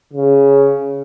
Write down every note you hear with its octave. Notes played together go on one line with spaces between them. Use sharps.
C#3